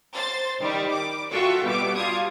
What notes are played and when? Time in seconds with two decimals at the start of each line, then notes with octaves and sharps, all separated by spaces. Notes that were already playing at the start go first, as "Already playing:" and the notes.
0.15 C5 A6
0.61 D#3 G3
0.90 D6
1.31 F4 F#4 A4 E5 G5 C#6
1.64 B2 G3 B3 D6
1.96 G3 F4 A5 D#6 G#6